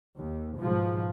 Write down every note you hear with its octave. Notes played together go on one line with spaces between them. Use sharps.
D#2
G#2 B2 F3